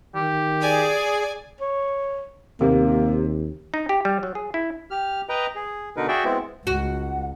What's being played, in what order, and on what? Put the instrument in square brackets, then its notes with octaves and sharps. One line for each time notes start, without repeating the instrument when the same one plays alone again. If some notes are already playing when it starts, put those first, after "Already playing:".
[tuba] D#3 [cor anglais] G4
[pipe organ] G#4 [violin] D5 G#5
[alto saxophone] C#5
[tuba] D#2 [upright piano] C3 [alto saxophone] A#3
[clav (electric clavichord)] D#4
G4
G3
F#3
G#4
E4
[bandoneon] G4 F6
B4 D#5 G5 A#5
G#4
B2 D3 D#4 A#4 B4
F#4 G#4 D5 E5 G5
G#3 B3 C4 E4
[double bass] C#2 [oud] F#4 [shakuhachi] F#5